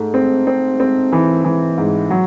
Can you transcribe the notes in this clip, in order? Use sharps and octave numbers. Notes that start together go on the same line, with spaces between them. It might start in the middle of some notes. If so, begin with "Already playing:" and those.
Already playing: G#2 A3
C4
C4
C4
E3
E3
G#2
F#3